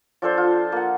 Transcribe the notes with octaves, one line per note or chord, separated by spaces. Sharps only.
F3 D4 A4 C5
F4
A#3 F#5